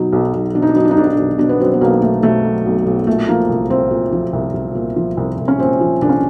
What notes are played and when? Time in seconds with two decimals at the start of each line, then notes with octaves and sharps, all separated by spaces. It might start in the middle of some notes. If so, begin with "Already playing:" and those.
Already playing: B2 F#3 D#4
0.13 B1
0.34 B1
0.54 B2 D4
0.62 D#4
0.69 D4
0.76 F#3 D#4
0.84 D4
0.91 D#4
0.97 B1 D4
1.06 D#4
1.12 D4
1.18 B1
1.38 B2 D4
1.49 B3
1.60 F#3 C4
1.74 B3
1.81 B1 A#3
2.02 B1 A3
2.23 B2 A3
2.44 F#3
2.65 B1
2.86 B1
3.07 A#2 A3
3.28 F3 A#3
3.49 C2
3.70 C2 C4
3.91 A#2
4.12 F3
4.33 C2
4.54 C2
4.75 A#2
4.96 F3
5.17 C2
5.38 C2
5.48 C#4
5.59 A#2 C4
5.81 F3
6.02 C2 D4
6.09 C#4